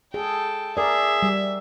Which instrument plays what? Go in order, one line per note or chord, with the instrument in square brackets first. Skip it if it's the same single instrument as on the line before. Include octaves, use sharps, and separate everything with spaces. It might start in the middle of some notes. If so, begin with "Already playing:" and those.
[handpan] G#4 [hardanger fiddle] A4 G5
[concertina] G#4 [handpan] A#4 D5 [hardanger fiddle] E5
[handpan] G3